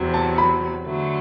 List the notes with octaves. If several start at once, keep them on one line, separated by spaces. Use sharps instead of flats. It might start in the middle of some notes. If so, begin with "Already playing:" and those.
Already playing: E2 C3 F#3
A5
B5
D3 F#3 A3